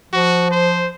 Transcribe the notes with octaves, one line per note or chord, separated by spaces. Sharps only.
F3 F#4
C5